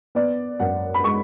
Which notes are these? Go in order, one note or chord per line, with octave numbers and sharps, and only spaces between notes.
B3 D5
F#2 F#5
B5
G#3 C#6